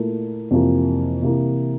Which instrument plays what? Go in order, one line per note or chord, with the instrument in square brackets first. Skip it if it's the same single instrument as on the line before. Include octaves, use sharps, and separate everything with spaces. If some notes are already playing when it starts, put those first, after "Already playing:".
Already playing: [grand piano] A#2 A3 E4 A#4
F2 C3 E3 A#3 F4
C3 E3 A#3 E4